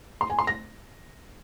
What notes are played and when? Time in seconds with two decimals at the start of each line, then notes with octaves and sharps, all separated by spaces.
0.21 C6
0.30 G#5
0.39 C6
0.47 A#6